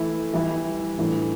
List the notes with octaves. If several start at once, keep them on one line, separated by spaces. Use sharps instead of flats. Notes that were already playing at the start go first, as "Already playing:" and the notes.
Already playing: E3 A3 E4
E3 G3 E4
A2 E3 A3 D4